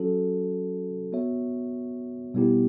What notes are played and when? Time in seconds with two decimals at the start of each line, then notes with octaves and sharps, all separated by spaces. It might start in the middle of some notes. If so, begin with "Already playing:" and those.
Already playing: F#3 C#4 F#4 A4
1.12 B3 F#4 C#5 E5
2.34 B2 G3 B3 E4 G4